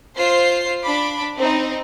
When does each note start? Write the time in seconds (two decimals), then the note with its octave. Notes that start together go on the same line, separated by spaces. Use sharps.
0.16 F4 C5 C6 C7
0.83 D4 B5 D6
1.37 C4 D#4